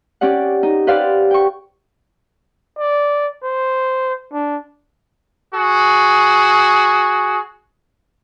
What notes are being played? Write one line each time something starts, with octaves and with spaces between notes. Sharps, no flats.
C#4 G4 D5 F#5
D#4
G4 B4 C5 D5 F5 F#5
G5 C#6
D5
C5
D4
F#4 G#4